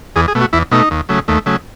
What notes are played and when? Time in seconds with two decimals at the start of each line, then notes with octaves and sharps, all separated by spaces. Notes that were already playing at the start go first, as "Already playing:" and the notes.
0.16 E2 G#4
0.28 G#4
0.35 B2 A3
0.41 F#4
0.53 E2 E4
0.71 B2 A3 D#4
0.91 D#2
1.09 C#3 F#3 A3
1.28 D#2 A3
1.46 C#3 F#3 A3